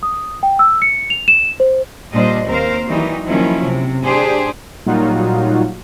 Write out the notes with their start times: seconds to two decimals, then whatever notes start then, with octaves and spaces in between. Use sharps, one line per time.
0.03 D#6
0.43 G5
0.59 E6
0.82 C#7
1.10 F7
1.28 E7
1.60 C5
2.13 A#2 G3 D4 C5 D#5
2.47 D#2 C4 A#4 C5 F5
2.88 D#3 E3 F#3 G3 D#4
3.26 D#3 F3 F#3 A#3 C#4 E4
3.64 C3
4.05 D4 G4 G#4 C5
4.86 A#2 F#3 G3 D#4 F4 F#4